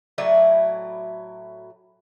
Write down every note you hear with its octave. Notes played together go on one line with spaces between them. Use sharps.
A2 F#3 E4 D5